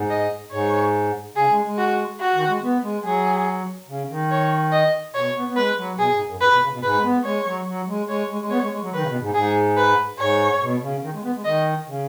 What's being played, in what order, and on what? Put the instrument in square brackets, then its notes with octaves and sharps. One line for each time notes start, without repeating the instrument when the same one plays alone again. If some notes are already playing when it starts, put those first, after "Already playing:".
Already playing: [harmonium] G#2
[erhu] D#5
[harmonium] G#2 [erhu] C#5
[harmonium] C#3 [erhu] G#4
[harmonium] G#3
G#3
[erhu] F#4
F#4
[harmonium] D#3
G#3
B3
G#3
[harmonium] F#3 [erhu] G#4
[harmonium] C#3
D#3
[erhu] C#5
D#5
[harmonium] B2 [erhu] C#5
[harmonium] B3
B3
[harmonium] G#3 [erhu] B4
[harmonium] F#3
[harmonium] B2 [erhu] G#4
[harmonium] G#2
F#2
[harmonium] G#2 [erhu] B4
[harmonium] B2
C#3
B2
[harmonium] G#2 [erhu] B4
[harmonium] G#3
B3
[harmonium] G#3 [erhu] C#5
[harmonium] F#3
F#3
G#3
[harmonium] G#3 [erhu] C#5
[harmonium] G#3
G#3
[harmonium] B3 [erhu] C#5
[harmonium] G#3
G#3
F#3
[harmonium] D#3 [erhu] B4
[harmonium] C#3
B2
G#2
[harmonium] G#2 [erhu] G#4
[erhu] B4
[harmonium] G#2 [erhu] C#5
[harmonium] B2
C#3
D#3
G#3
B3
G#3
[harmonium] D#3 [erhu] D#5
[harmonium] C#3